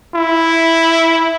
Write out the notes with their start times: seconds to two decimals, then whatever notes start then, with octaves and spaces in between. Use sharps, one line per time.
0.15 E4